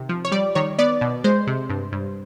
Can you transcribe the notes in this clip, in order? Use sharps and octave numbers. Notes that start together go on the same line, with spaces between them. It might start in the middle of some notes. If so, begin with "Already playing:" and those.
Already playing: C3 D#3
F3
C#5
G3 D5
D#3 C#5
B3 D5
B2
G#3 C5
C3
G2
G2